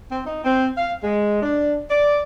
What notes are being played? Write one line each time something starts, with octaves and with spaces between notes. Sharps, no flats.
C4
D#4
C4
F5
G#3
D4
D5